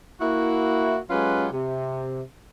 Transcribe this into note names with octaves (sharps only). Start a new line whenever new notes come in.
A#3 E4 F#4
F#3 G#3 C#4 F4 G4 B4
C3